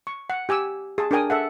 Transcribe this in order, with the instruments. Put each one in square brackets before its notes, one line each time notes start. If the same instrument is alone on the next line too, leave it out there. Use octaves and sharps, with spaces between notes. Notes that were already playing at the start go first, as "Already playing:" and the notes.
[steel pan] C#6
F#5
G4 G#5 D6 E6
G#4 A5
D4 G#4 A#4 G5 G#5 D#6
A4 E5 F#5